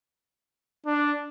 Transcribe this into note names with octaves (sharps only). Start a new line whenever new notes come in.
D4